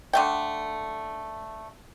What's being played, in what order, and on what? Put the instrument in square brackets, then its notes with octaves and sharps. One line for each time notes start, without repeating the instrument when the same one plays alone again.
[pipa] D3 A3 G5